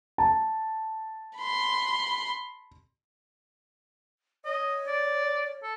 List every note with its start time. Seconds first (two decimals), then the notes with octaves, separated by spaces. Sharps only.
0.18 A5
1.37 B5 C6
4.45 C#5 D#5
4.87 D5
5.63 A4